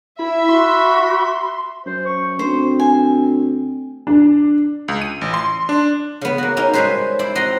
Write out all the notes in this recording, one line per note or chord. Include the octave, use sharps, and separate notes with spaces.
E4 E5 B5
F#4 C6
F#2 C5
C#6
D2 C4 C5
G#5
D4
C#2
D#7
A1
C6
D4
C#3 B3
A#3 F#4
A#3 C#4 D#4
G3 G#3 C#4 G#4 B4 C5
E4 C5 D5
C4 F#4 D#5 A#5 C6